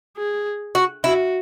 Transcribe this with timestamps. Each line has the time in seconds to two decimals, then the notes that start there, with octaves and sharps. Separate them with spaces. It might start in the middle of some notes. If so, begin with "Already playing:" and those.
0.18 G#4
0.75 F#4
1.04 E4 F#4